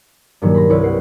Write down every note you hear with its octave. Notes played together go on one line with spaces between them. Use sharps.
G2 A#2 D#3 F#3
B5 C6 A#6
C2 E4 B4 C#5 C#7
F#5 C7